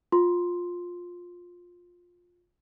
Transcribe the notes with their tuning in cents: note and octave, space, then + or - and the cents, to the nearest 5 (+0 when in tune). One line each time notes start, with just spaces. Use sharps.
F4 +15 C6 +0